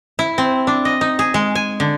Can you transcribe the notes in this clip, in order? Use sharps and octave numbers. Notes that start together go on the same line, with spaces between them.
E4
C4
D4
D#5
D#4
G#4
G#3
G#5
D3